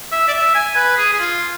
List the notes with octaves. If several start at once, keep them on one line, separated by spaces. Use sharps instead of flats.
E5
D5
E5
G#5
B4
G#4
G#4
F4